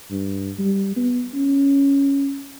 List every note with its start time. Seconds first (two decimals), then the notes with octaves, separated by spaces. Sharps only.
0.11 G2
0.59 G3
0.97 B3
1.34 C#4